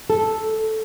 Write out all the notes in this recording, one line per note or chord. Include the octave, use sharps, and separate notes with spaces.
A4